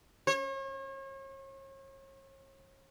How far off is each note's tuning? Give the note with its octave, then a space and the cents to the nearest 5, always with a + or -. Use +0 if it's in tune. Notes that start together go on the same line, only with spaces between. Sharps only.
C#5 -40